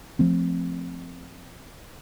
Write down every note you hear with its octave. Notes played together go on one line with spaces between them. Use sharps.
F3 A3 C4